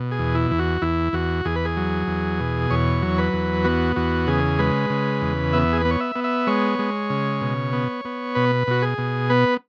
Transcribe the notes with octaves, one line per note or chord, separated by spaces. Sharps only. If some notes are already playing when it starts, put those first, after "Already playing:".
Already playing: B2
G#4
E2
E4
E2
F#4
E2 E4
E2 F#4
E2 G#4
B4
G#4
F#3
E2
B2
E2 C#5
F#3
B4
E2
B3 F#4
E2 F#4
C#3 G#4
G#3 B4
C#3
E2
B3 E5
G#4
B3 B4
C#5
E5
B3
E5
G#3 C#5
G#3
C#3
B2
B3
B3
B2 B4
B2 F#4
G#4
B2
B3 B4